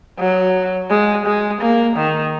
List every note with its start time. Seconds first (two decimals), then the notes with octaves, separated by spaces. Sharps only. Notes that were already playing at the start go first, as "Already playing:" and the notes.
0.19 F#3
0.90 G#3
1.26 G#3
1.62 A#3
1.97 D#3